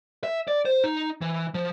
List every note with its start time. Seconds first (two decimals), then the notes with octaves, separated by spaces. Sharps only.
0.24 E5
0.48 D5
0.65 C5
0.84 D#4
1.21 E3
1.54 F3